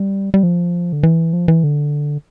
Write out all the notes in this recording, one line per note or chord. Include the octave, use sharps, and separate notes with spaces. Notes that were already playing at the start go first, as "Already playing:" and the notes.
Already playing: G3
G3
F3
D3
E3
F3
E3
D3